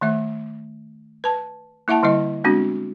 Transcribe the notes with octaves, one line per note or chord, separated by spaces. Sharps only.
D#3 A3 E5
B4 A5
A#3 E4 E5 F#5 A5
D3 G3 E4 D#5
G#3 B3 C4 D4 F#4